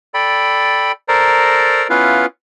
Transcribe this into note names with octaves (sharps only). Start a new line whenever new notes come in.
A4 D5 G5 B5
A4 A#4 C5 D5 A#5
B3 C#4 E4 F4 B4 F5